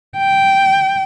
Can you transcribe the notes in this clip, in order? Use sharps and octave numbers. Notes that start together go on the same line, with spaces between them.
G5